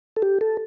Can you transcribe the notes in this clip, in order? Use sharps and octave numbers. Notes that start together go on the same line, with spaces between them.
A4
G4
A4